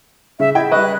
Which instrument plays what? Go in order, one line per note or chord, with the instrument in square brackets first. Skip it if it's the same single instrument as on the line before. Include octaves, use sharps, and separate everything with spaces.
[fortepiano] C#3 [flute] E5
[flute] E4 [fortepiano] G#4 D#5 [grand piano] G5 G#6
[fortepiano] G3 D#5 C#6 [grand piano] B4 [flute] F#6